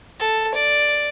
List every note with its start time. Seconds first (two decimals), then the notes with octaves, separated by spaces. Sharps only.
0.20 A4
0.55 D5